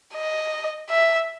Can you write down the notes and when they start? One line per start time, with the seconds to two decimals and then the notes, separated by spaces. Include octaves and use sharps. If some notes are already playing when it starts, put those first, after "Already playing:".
0.14 D#5
0.90 E5